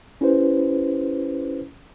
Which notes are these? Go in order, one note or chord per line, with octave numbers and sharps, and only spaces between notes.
C#4 E4 G4 B4 C5